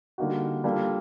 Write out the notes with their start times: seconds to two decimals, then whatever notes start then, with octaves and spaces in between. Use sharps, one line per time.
0.18 D3 G3 A#3 D#4 F#4
0.64 G3 A#3 D4 F4 A4